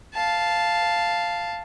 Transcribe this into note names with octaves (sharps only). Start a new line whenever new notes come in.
F5 A5